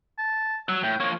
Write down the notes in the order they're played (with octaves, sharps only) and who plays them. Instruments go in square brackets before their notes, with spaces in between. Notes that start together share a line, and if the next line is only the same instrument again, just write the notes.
[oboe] A5
[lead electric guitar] F#3 [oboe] E6
[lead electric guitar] A2 [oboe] G5
[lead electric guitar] F3 A#3 [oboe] C#5